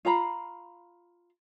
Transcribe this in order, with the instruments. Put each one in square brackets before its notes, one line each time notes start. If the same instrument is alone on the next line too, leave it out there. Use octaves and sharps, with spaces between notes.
[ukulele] F4 F5 A#5 B5